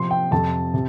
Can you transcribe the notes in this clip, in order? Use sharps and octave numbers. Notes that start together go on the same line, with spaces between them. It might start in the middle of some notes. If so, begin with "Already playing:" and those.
Already playing: C3 F3 C4 C6
G5
F2 C3 F3 A5
C3